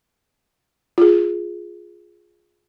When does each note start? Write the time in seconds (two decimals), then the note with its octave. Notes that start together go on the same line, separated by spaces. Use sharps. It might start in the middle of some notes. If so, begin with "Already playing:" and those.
0.98 F4 G#4